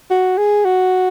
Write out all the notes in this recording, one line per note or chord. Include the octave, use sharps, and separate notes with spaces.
F#4
G#4
F#4